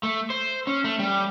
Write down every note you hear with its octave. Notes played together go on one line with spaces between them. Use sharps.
A3
C5
C#4
A3
G3